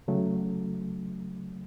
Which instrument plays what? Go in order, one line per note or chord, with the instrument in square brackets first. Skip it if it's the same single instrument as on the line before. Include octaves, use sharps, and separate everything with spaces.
[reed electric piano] C#3 F#3 A3